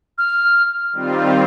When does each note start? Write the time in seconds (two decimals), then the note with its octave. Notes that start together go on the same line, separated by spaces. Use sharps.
0.18 F6
0.93 D#3 G3 C4 F4